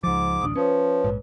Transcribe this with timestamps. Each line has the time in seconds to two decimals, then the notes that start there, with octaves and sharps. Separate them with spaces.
0.03 C#2 G#2 F3 D6
0.41 D1 A1 D4 D#6
0.56 F3 C#4 B4 C#5
1.04 A#1 G#2